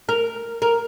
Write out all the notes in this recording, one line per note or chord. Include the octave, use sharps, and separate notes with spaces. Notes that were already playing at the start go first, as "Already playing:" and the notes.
A#4
A#4